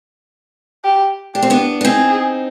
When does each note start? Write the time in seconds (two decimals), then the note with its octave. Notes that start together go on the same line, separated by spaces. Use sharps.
0.84 G4
1.34 D4 G4
1.43 C4
1.50 B3 D4
1.81 D4
1.85 C4 D#4 G#4